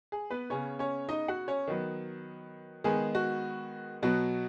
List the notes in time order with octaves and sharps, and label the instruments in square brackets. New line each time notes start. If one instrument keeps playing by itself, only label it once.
[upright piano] G#4
B3 B4
C#3 B3 C#4 C#5
C#4 C#5
D#4 D#5
F#4 F#5
C#4 C#5
D#3 F#3 B3
D#3 G#3 B3 G#4
F#4
B2 F#3 B3 F#4